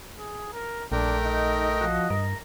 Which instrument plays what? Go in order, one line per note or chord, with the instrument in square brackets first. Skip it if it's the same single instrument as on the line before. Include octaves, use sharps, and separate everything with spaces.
[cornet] G#4
A#4
[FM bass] A#1 [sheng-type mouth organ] A3 A#4 G5 [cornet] D4
[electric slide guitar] D#4 [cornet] D#5
[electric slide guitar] F3 F#4
[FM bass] G2 [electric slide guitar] A#4